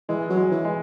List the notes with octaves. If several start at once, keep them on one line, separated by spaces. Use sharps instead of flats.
E3 G#3
F#3
G#3
E3
G#3